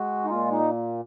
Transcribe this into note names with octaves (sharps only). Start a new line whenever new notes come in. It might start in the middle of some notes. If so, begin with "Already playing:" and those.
Already playing: G#3 F#4
D#4
A#2 F4
D#4